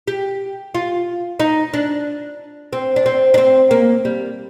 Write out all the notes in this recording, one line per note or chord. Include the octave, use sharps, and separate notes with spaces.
G4
F4
D#4
D4
C4
D4
C4
D4
C4
A#3
G3